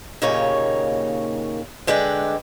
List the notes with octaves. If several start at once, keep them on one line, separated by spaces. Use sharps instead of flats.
D#2 A#2 C#3 A#3 D#4 C#5
D3 G#3 B4 D5 G5